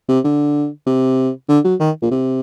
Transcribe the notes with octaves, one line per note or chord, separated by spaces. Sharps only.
C3
D3
C3
D3
F#3
D#3
A#2
C3